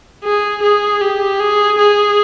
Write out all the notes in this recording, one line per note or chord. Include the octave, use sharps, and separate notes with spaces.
G#4
G#4
G4
G#4
G#4